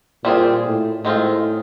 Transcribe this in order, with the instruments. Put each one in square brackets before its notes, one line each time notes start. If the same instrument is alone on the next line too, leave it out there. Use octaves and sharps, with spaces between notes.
[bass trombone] A#2 [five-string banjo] G3 C4 F4 G#4
[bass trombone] A2
[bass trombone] A2 [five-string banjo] D#3 G#3 C4 F4